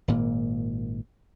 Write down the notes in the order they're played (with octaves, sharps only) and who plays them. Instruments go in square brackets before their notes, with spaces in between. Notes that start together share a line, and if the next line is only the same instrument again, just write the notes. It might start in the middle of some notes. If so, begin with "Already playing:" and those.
[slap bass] G#1 A#2 A#3